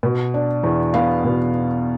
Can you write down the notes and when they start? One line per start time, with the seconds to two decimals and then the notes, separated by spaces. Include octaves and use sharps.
0.03 B2
0.34 D4
0.63 E2
0.94 B3 F5
1.24 B2